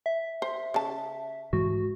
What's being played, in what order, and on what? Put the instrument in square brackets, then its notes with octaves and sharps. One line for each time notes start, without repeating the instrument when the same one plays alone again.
[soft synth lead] E5
[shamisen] C5
C#3 A5
[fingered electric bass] G#2 E3 G#3 [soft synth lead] F#4